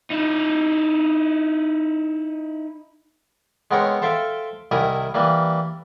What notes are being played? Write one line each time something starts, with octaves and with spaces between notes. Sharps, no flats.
D#4 E4
G#3 B3 C4 A#4 C#5
A4 C5 E5 F5 G5
C2 D#3 E4 A#4 G#5 A#5
E3 G3 A#3